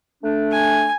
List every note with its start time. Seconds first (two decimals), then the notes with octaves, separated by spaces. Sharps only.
0.22 A3 D4
0.51 G#5